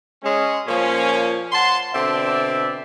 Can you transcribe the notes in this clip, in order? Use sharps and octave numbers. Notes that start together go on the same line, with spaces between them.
G#3 C#4
A#2 F3 A#3 C#4
F#5 A5 C6
B2 D3 C4 D5 E5